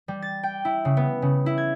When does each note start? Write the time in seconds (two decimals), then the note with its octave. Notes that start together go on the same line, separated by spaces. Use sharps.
0.08 G3
0.22 A6
0.43 G5
0.65 E4
0.85 C#3
0.97 B3
1.22 C#3
1.46 E4
1.58 G#6